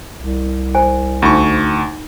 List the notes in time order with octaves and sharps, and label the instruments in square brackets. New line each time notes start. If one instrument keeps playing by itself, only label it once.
[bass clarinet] C2
[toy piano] C5 G#5
[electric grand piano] D2 C#6 [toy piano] D#4 E4 B5